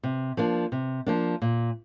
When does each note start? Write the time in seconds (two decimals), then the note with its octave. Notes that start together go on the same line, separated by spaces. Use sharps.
0.03 C3
0.37 F3 A#3 D4
0.72 C3
1.06 F3 A#3 D4
1.42 A#2